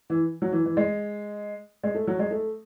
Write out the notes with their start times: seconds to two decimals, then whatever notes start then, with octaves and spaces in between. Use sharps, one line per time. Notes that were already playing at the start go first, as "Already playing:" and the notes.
0.10 E3
0.42 F#3
0.52 E3
0.65 E3
0.77 G#3
1.84 G#3
1.95 A3
2.07 F#3
2.19 G#3
2.31 A3